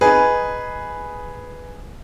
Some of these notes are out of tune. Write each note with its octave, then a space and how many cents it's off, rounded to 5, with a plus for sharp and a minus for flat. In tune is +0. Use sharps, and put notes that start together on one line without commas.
D#4 +0 G#4 +0 B4 +0